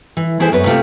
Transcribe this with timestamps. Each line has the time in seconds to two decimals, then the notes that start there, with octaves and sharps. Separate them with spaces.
0.17 E3
0.40 E3 E4 G#4 A4 C5 G#5
0.52 F#2 B3 B4 C#5
0.66 C3 A3 F4